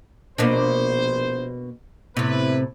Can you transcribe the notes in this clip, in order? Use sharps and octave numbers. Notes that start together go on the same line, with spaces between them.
A#1 B2 A#3 D4 C5
A2 C3 B3 E4 B4